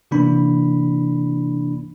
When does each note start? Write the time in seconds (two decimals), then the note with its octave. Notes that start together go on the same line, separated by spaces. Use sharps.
0.11 C3 E3 A#3 D4 B5